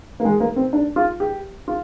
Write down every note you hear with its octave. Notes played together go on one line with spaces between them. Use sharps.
A#3
G#3
A#3
C4
D4
F4
G4
F4